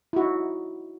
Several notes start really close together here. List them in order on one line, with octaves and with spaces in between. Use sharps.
E4 F#4 D#4